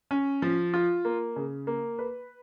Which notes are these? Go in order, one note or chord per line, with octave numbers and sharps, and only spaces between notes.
C#4
F3
F4
A#3
C#3
A#3
B4